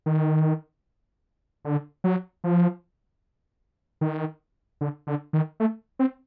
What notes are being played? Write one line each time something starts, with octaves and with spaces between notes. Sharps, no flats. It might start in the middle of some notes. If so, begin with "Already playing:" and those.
D#3
D3
F#3
F3
D#3
D3
D3
D#3
A3
C4